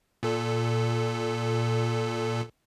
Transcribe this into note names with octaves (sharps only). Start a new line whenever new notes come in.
A#2 A4